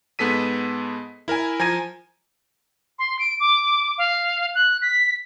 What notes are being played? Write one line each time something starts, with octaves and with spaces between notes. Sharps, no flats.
G#2 B3 G#4 A4 B6 D#7
E4 A#4 E5 G#5
F3 G#5 A#5 G#6 A#6 D#7
C6
D7
D6
F5
F#6
B6